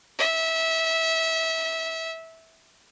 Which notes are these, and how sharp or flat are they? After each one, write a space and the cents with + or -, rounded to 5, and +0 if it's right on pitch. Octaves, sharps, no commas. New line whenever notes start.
E5 -20